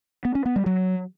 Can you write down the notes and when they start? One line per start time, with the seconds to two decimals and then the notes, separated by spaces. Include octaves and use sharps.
0.25 B3
0.35 C#4
0.46 B3
0.56 G3
0.66 F#3